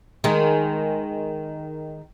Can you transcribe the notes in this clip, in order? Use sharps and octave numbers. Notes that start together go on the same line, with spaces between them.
D#3 G#3